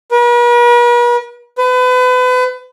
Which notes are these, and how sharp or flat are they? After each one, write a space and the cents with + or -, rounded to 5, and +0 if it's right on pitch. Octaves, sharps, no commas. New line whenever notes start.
B4 -45
B4 +35